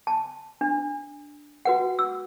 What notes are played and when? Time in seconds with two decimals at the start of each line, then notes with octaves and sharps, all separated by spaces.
0.07 A5
0.61 D4
1.65 F#4 B4 F#5
1.99 E6